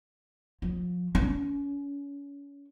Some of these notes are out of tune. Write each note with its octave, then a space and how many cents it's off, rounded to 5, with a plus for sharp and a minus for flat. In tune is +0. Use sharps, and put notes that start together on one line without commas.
F3 +35
C#4 +30